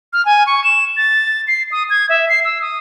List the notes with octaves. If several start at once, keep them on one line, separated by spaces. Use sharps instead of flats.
F6
G#5
C#6
E7
A6
C7
D#6
G#6
E5
C7
E6
D#6